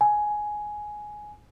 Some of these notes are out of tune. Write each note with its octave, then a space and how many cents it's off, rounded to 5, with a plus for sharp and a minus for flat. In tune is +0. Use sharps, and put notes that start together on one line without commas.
G#5 +10